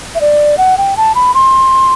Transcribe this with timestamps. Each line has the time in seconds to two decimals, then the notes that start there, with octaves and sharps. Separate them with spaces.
0.15 E5
0.21 D5
0.58 F#5
0.78 G5
0.97 A5
1.15 B5
1.34 C6